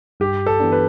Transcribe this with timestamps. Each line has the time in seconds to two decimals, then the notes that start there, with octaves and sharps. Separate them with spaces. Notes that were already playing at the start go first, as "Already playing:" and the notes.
0.20 G2 G4
0.46 A4
0.60 E3 B3 D4
0.72 B4